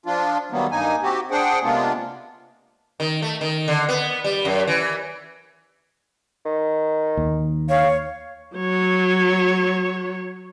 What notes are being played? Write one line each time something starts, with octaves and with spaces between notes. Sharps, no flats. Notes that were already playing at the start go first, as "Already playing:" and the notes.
F3 D4 F4
D#3 F#3 G3 A#3 B3
G2 A#3 D#4 G#5
C4 F#4 G4
D4 G#4 C5 F#5 G5
C3 G#3 A#3 B3 D4 F4
D#3
A3
D#3
D3
B3
G3
F#2
E3
D#3
D#2
C#5 F5
F#3 C#5